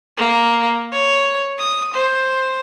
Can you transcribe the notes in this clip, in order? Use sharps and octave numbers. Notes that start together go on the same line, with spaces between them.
A#3
C#5
D#6
C5